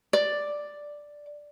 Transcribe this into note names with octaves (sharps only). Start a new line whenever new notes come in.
D5